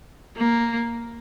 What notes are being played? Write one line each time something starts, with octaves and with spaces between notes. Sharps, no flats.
A#3